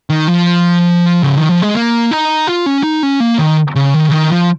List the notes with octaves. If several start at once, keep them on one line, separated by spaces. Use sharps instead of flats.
D#3
F3
C#3
D#3
F3
G#3
A#3
D#4
F4
C#4
D#4
C#4
A#3
D#3
C#3
D#3
C#3
D#3
F3